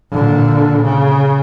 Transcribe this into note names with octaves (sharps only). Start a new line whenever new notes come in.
A#2 D3
C#3